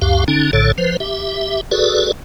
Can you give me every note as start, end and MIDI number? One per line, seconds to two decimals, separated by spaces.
0.02 0.24 37
0.02 0.24 42
0.02 0.24 67
0.02 0.24 77
0.28 0.51 50
0.28 0.51 61
0.28 0.51 63
0.53 0.72 34
0.53 0.72 45
0.53 0.72 50
0.53 0.72 69
0.53 0.72 73
0.78 0.97 53
0.78 0.97 71
0.78 0.97 72
1.00 1.61 67
1.00 1.61 76
1.71 2.12 66
1.71 2.12 68
1.71 2.12 69
1.71 2.12 71
1.71 2.12 74